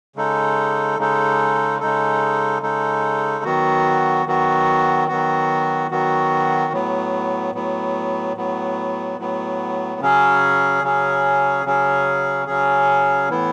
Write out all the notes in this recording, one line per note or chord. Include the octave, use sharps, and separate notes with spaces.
C#3 G#3 D#4 A4
C#3 G#3 D#4 A4
C#3 G#3 D#4 A4
C#3 G#3 D#4 A4
D#3 F#3 B3 F#4
D#3 F#3 B3 F#4
D#3 F#3 B3 F#4
D#3 F#3 B3 F#4
A2 F#3 B3
A2 F#3 B3
A2 F#3 B3
A2 F#3 B3
C#3 F#3 C#4 G#4
C#3 F#3 C#4 G#4
C#3 F#3 C#4 G#4
C#3 F#3 C#4 G#4
A2 E3 B3 E4